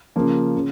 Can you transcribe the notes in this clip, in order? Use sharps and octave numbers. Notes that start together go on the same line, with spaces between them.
C#3 F3 A#3
C#3